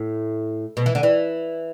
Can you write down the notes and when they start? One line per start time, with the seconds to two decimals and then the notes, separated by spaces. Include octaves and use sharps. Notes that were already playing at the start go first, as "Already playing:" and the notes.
Already playing: A2
0.77 B2
0.86 E3
0.95 D3
1.03 E3